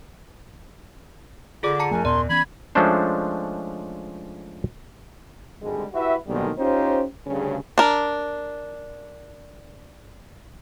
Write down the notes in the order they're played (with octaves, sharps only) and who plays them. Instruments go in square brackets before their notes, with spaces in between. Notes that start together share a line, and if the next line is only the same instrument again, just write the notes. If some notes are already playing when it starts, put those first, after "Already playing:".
[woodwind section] D3 [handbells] F4 G#4 D5 [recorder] D6
[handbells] A5 A#5 C#7
[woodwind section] F#2 [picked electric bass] F3 A3 [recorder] G#5
[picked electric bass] D#2 A#2 B3 [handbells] D5 [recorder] C6
[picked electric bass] E3 B3 C#4 [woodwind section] B5 [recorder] G#6
[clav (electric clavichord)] F3 G#3 A3 C#4 D4 C5
[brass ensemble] G#1 D2 D3 G3 G#3
E4 F#4 G4 B4 E5
B1 G#2 D3 D#3 G3 A#3
C#4 D#4 F4 G4 C5
D2 G2 C#3
[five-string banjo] D4 A#4